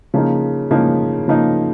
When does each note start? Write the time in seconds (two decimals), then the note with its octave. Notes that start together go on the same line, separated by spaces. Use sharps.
0.14 C#3 F3 A#3 D#4
0.71 C#3 F3 A#3 D#4
1.28 C#3 F3 A#3 D#4